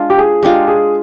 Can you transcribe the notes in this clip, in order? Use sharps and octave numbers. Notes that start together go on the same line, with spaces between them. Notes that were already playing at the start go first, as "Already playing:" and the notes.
Already playing: G#3 D4 F4
G4
G#4
G#3 D4 F4 G4
G#4